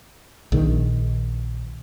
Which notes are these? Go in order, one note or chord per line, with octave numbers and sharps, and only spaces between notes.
A#1 D#3